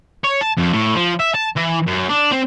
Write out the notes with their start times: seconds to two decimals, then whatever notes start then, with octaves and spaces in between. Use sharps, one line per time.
0.24 C#5
0.41 A5
0.57 F2
0.73 A2
0.95 F3
1.20 E5
1.35 A5
1.57 E3
1.87 F#2
2.09 D4
2.32 C4